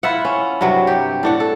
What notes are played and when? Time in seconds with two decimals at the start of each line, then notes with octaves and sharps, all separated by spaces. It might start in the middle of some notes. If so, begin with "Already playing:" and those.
0.03 E4 F4 E5 F#5
0.25 C#4
0.61 G2 C3 F#3
0.87 G4
1.23 A2 D4 F#5
1.40 A4